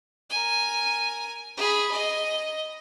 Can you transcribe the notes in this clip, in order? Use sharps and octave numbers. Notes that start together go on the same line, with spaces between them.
A#4 G#5
G#4 B5
D#5